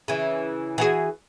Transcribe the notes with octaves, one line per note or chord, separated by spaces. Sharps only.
C#3 E3
E3 F#4 G#4